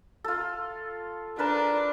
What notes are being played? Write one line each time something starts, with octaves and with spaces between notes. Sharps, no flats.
F4 A4
D4 A#4 B4 A5